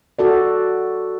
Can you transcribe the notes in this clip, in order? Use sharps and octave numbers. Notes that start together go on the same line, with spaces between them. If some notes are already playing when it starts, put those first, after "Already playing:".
F#4 A4 D5